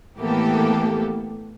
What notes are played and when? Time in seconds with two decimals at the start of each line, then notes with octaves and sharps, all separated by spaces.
0.18 A2 E3 A#3 B3 G4 A4